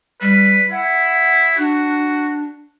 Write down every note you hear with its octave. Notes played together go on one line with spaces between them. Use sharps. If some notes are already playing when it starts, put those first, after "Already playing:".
G3 B4
E4 F#5
D4 F#4